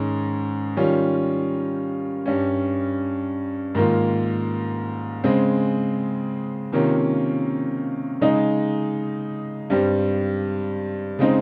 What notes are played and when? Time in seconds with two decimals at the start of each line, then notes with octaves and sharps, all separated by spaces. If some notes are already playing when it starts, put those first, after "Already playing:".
Already playing: G#2 D#3 G#3 C#4
0.77 D#3 G3 C#4 F4
2.26 G2 G3 C#4
3.75 G#2 D#3 A#3 F4
5.24 C#3 G#3 C4
6.72 C3 D#3 A#3 C#4 F4
8.21 C#3 G#3 D#4
9.70 G2 G3 C4
11.19 C#3 G#3 C4 D#4